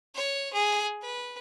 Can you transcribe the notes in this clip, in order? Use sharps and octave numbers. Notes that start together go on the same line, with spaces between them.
C#5
G#4
B4